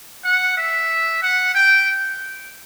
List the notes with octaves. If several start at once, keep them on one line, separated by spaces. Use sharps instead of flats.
F#5
E5
F#5
G5